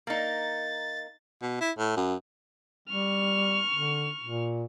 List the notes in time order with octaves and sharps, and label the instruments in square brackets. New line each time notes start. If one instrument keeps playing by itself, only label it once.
[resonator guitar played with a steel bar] A#3 D#4 [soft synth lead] A6
[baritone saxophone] B2
E4
A2
F#2
[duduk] G3 [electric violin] C#6 F6
[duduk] D3
A#2